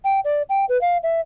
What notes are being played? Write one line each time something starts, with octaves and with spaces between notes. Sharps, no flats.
G5
D5
G5
B4
F5
E5